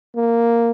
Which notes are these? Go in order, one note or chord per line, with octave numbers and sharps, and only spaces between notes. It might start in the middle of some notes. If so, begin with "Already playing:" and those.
A#3